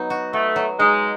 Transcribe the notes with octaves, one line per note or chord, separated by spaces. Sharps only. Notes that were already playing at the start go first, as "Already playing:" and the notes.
Already playing: F#3 B3 D#4
F#4
A3 B3
F#3
G#3 D#4